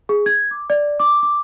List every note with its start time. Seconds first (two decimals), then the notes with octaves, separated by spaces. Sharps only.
0.09 G#4
0.26 G#6
0.51 D6
0.70 D5
1.00 D6
1.23 D6